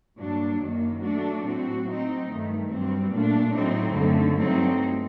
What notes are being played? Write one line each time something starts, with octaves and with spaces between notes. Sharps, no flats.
G2 F#3 A#3 D4
F#2 D#3 F#3 A#3
F#3 A3 D4 F#4
A2 F#3 C4 F#4
F#3 C4 D#4
G2 D#3 A3
G2 F#3 C4
A#2 A3 D4
A2 F#3 A3 C4 D#4
F#2 D3 A3
G2 F#3 A3 C4 D#4